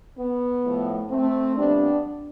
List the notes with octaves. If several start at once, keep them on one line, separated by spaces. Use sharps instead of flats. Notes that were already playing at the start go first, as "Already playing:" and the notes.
B3
A2 F3 A3
A3 C4
F2 C3 G3 B3 D4